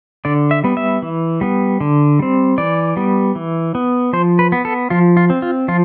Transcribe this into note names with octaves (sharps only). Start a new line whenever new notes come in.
D3 D5
E5
G3 B3
E5
E3
G3 B3
D3
G3 C4
E3 D5
G3 B3
E3
B3
F3 C5
B4
B3
A4
F3 F4
F4
C4
F4
F3 F4